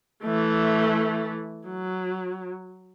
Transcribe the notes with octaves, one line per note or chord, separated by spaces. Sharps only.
E3 A3
F#3